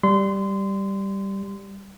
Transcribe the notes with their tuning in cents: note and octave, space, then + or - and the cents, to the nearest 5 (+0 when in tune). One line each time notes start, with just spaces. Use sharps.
G3 +0 C6 -25